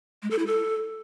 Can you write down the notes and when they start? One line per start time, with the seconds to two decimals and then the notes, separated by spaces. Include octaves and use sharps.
0.22 G#3
0.30 A4
0.39 E4
0.47 A4